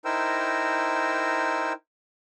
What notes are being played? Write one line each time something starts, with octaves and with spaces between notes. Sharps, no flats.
D#4 E4 A#4 C5 G5 E6